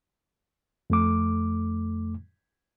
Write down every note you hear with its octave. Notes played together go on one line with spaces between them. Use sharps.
F2 A3 D6